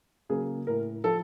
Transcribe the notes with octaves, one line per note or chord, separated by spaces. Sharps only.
C#3 F#3 A#3 G#4
A2 A#4
F3 A4